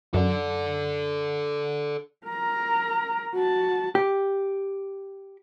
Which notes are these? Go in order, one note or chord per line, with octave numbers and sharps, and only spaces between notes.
F#2 A4 D5
A#4 A#5
F#4 A5
G4